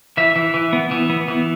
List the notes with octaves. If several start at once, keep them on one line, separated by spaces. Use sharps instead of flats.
E3 E5
E3
E3
B3
E3
B3
E3